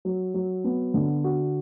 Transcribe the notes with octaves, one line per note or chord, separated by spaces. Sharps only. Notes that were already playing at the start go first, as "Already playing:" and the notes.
F#3
F#3
B3
D3
F#4